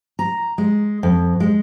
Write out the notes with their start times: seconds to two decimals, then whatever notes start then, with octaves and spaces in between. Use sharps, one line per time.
0.19 A#5
0.58 G#3
1.03 F2
1.40 G#3